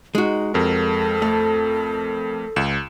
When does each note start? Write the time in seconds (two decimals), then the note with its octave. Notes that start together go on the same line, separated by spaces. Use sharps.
0.15 G#3 D#4 F#4
0.54 F2 A4 A#4
1.22 A3
2.56 C#2 E7